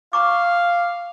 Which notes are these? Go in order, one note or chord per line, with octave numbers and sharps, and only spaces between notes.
F5 A#5 C#6 D6